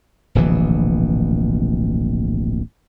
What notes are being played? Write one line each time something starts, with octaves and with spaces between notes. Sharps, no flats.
D1 A#1 B2 E3